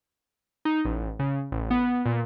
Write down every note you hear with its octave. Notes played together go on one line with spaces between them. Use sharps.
D#4
A1
C#3
A1
B3
A#2